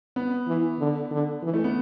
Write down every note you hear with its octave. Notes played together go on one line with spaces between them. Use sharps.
B3
E3
D3
D3
E3
A3
B3